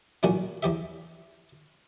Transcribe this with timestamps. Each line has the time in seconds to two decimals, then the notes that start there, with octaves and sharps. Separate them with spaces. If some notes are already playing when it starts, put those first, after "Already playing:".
0.23 A1 A#2 F#3 C#4 D4
0.63 E2 G4 E5